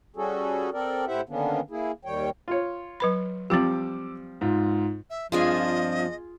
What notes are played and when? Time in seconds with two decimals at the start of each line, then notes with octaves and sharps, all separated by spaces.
0.16 G3 C#4 F#4 G#4 A4
0.73 C4 A4 A#4 D5
1.07 A2 E4 G4 C5 E5 F#5
1.29 D3 D#3 A#3 B3 C#4 D4
1.71 A#3 E4 G#4
2.05 D#2 D#3 G3 C#5 G5
2.48 F4 C#5
3.00 F#3 B4 B5
3.50 F3 G3 C4 G4 D6 E6
4.41 G#2 F4
5.10 E5
5.32 G2 F3 C4 D4 F4 G#4 D#5 G#5